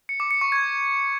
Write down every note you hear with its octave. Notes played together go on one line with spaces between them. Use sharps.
C#7
D6
C#7
C#6
G#6